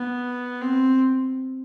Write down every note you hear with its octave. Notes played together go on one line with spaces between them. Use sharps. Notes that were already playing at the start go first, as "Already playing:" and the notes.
Already playing: B3
C4